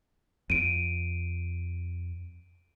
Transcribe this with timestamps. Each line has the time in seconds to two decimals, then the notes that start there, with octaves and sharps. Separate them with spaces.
0.50 F2 D7 D#7